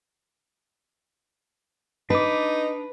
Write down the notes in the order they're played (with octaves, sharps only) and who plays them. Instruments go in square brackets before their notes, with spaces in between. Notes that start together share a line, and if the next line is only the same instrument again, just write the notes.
[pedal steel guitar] D4 D6 [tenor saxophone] D#4 [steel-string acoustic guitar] B4